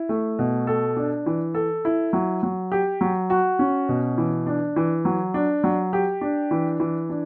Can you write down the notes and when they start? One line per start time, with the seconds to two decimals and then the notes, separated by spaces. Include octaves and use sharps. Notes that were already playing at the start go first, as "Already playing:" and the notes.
Already playing: E4
0.09 A3
0.39 B2
0.67 A4
0.97 D4
1.26 E3
1.54 A4
1.85 E4
2.13 F#3
2.43 F#3
2.72 G4
3.01 F#3
3.30 F#4
3.59 C#4
3.89 B2
4.18 E3
4.47 D4
4.76 E3
5.05 F#3
5.34 D4
5.64 F#3
5.93 G4
6.21 D4
6.51 E3
6.80 E3
7.09 D4